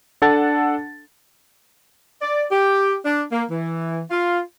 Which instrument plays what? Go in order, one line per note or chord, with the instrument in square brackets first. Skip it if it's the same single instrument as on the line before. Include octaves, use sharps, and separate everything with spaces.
[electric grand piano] D4 A4 F#5 A5 A6
[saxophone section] D5
G4
D4
A#3
E3
F4